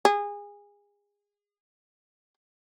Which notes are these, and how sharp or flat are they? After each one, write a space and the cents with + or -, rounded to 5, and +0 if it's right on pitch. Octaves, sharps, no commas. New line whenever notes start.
G#4 -25